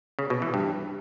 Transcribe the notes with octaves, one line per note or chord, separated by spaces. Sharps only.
C#3
B2
E3
G2